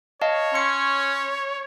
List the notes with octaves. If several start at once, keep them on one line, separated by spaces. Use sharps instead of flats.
C#5 D#5 F5 A5
C#4 C6 C#7